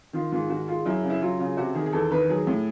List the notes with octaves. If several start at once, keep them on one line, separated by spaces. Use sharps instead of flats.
D#3 F4
G#2 F4
D#3 F#4
G#3 F4
F#2 E4
C#3
E4
F#3 F4
C#3
C3 F#4
D#3 G#4
G#4
E2 A4
D#3 B4
F#3 G#4
A2